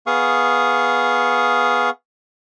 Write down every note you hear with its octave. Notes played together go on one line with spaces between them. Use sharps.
B3 G#4 F5 C#6 D#6